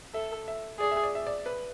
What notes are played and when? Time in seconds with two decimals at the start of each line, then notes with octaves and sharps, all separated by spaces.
0.14 A4 E5
0.48 E5
0.79 G#4 D5
0.91 E5
1.03 D5
1.15 E5
1.27 D5
1.46 B4